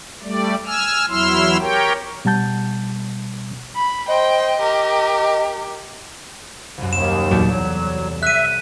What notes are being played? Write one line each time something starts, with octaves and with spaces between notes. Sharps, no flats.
G3 A3 D5
G#5 E6 F6
E2 F#3 E4 C6 E6 F6
G4 A#4 C#5 G5
B2 G3 F#5 A5 G6
B5
C5 D#5 G5
G4 A#4
C2 F#2
D#2 E7
E2 A#2 F#3 G4 A4 D5
E2 F#3
E5 F#6 D#7